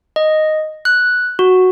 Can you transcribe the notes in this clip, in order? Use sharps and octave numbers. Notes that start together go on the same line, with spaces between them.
D#5
F#6
F#4